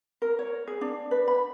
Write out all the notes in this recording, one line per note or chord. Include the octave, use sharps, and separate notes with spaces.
A#4
C#5
G#4
D4
B4
B5